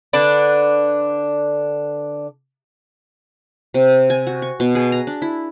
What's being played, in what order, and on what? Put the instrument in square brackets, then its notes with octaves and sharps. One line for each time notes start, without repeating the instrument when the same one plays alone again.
[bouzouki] D3 D4 B4 D5
[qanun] C3
G#5
F#4
C#6
B2
G#4
A#5
D4
E4